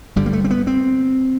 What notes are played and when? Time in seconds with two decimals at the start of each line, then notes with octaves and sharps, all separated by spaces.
0.16 G1 G2 D3 G3
0.26 A#3
0.33 A3
0.44 C4
0.50 B3
0.67 C4